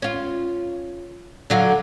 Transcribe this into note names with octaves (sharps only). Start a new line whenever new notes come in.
C#4 F4
D3 F#3 F5